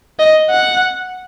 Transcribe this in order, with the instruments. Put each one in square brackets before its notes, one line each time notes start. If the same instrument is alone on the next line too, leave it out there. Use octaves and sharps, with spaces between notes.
[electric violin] D#5
F#5